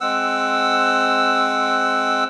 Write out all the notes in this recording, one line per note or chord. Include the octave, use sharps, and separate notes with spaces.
G#3 C4 F#5 E6